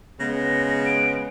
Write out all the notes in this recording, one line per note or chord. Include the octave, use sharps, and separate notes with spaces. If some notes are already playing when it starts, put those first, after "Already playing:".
C#3 G#3 B3 A#6
D7